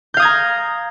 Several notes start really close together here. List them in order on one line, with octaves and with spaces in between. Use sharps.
G6 F5 D#6 G#6 A#5